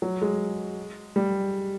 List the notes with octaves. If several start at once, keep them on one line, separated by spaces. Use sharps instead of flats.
F#3
G#3
G3